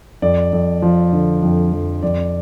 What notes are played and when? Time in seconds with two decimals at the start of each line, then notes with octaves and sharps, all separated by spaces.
0.22 F2 D5
0.53 F2
0.82 F3
1.13 D3
1.42 F2
1.72 F2
2.02 F2 D5